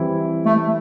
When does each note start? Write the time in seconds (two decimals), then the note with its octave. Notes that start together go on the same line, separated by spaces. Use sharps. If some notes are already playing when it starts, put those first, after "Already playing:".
Already playing: E3 G3 C4 E4
0.45 A3